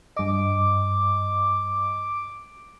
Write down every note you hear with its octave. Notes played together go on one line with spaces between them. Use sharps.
G2 D#5 D6